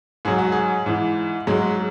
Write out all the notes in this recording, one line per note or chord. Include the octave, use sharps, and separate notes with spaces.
G#2 F#3 G#4
F#4
G#4
G#2 E3
G#2 F#3 G#3